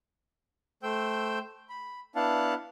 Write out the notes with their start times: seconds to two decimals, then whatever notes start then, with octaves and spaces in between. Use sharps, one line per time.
0.83 A3 C5 G5 E6 G6
1.69 B5
2.16 B3 D4 E4 F5 F#5 A5